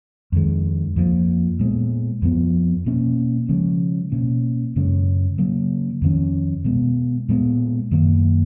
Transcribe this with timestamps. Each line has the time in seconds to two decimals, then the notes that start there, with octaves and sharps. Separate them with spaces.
0.32 F2 D#3 G#3
0.96 F2 F3 A#3
1.59 A#2 G#3 B3
2.22 F2 F3 B3
2.86 B2 A#3 C#4
3.49 C#3 F3 G#3 C#4
4.12 B2 A#3 C#4
4.76 F#2 C#3 G#3 C#4
5.38 C#3 F#3 A#3
6.02 F2 D#3 A#3 C#4
6.65 B2 G#3 B3
7.29 A#2 G#3 B3
7.91 F#2 D#3 A#3